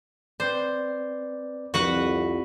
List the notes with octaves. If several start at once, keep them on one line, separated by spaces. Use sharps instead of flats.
C4 B4 C5 D5
C2 F2 G3 F#4 B4 F#5